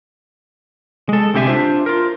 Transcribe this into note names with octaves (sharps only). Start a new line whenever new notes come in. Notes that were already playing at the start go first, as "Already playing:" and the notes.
G#3 A4
C2 D3 C4 G4 E5 G#5
D4 F4 C5 E5
F4 A#4